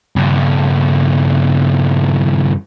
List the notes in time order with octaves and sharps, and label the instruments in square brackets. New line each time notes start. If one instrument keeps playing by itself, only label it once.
[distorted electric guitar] G2 C#3